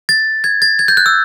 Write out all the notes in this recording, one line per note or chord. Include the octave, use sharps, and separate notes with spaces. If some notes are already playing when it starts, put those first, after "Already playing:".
A6
G#6
A6
G#6
G6
F#6
E6